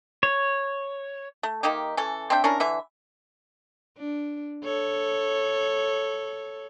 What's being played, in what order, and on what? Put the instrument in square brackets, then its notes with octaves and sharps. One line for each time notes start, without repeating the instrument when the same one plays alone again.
[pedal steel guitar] C#5
[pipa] A3
D#3 A#3 D#4 G4
E3 C#4 A4
C4 D4 E5 G5
C#4 D4 E4 A#4
D3 E3 E5
[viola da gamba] D4
A4 C#5